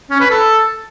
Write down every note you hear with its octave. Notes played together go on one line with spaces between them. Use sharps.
C#4
B4
A4